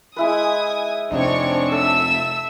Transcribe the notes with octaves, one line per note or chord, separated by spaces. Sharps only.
G#3 E4 B4 G#5 D#6
F2 C3 C4 D4 D#4 C#5 C#6 E6
A4 E5 E6